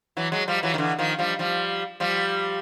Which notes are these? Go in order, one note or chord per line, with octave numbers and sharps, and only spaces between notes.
E3 F#3
F#3 G#3
F3 G3
E3 F#3
D#3
D3 E3
D#3 F3
F3 G3
F3 G3
F3 G3